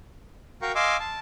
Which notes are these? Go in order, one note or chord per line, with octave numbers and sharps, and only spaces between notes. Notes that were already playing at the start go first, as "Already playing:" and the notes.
F#4 A#4 F5 G5 A#5 C#6
D#5 F5 G#5 C6 D6 E6
A5